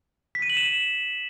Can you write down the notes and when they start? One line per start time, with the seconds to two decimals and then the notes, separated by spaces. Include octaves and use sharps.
0.35 B6
0.42 D#7
0.50 F#7
0.57 E7